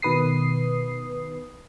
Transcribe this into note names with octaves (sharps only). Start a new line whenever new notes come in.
B2 D#3 B4 D#6 C7